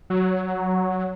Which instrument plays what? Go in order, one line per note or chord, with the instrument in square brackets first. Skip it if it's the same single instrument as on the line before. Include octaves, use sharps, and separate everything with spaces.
[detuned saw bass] F#3